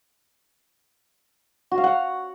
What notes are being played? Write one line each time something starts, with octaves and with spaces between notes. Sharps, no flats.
F#4
F5
F#5